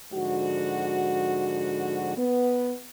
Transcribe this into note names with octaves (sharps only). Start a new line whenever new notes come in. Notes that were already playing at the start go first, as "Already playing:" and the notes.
G#2 D3 F3 F#4
B3